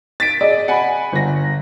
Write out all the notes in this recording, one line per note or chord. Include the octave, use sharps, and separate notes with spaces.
A6 B6 D7
G#4 D5 D#5
F#5 G#5 B5
G1 A#6